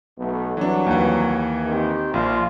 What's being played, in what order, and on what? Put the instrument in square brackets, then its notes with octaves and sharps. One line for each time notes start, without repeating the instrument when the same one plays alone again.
[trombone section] B1 A3 B3
[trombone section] C2 F#3 [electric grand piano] E3 D4
[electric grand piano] D#2 E3
[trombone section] D#3 C4 G4
[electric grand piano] A#1 [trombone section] F4